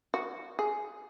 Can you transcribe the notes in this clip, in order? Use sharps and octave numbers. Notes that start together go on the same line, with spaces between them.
F#4
G#4